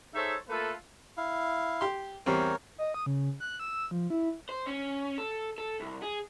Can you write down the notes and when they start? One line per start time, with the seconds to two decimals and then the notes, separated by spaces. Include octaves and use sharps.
0.15 D#4 G#4 A4 C5 C#5 E5
0.49 A3 A#3 E4 F4 A4 B4
1.17 E4 F5
1.81 G4 C6
2.26 E2 G3 C4 A#4 C#5
2.78 D#5
2.94 D#6
3.06 C#3
3.40 F#6
3.59 E6
3.91 F3
4.10 E4
4.49 C5
4.66 C#4
5.18 A4
5.58 A4
5.80 C2
6.02 G#4